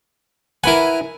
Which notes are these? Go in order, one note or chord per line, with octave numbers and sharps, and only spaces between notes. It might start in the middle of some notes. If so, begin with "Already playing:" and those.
E4 A#4 B4 F#5 G#5